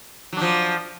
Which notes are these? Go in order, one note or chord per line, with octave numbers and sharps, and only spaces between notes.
F3 F#3 D4